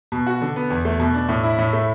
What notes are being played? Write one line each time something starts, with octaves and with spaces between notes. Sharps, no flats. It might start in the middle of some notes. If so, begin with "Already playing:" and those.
B2
F#4
D3
B3
E2
A3
B2
D4
A2
E4
A2
A3